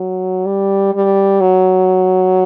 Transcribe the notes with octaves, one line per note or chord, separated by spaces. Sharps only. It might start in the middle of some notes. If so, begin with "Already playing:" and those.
Already playing: F#3
G3
G3
F#3